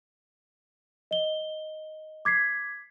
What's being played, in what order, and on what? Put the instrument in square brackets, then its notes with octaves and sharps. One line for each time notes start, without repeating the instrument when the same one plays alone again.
[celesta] D#5 G7
D6 G#6 B6 C7